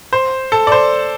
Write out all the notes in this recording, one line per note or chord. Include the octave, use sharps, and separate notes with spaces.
C5
A4
D5
C5